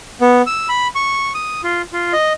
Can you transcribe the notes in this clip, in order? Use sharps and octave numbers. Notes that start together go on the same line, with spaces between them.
B3
E6
B5
C#6
D#6
F4
F4
D#5